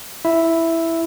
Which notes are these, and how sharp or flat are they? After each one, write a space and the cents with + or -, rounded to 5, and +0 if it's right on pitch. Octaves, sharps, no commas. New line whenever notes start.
E4 +0 E5 +0